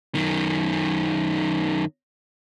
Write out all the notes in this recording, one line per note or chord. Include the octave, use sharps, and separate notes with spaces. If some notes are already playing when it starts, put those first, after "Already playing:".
F#2 D#3